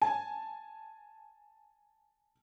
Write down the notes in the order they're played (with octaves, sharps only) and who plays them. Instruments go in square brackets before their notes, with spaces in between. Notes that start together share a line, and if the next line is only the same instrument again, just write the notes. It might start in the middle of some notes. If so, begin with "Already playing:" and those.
[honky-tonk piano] G#5 A5